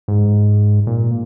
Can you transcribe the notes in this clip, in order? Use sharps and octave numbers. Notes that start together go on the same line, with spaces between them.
G#2
A#2